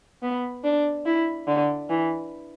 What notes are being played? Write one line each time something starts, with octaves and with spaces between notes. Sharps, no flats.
B3
D4
E4
D3
E3